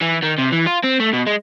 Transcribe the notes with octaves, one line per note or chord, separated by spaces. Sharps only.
E3
D#3
C3
E3
F4
C4
A3
B2
G#3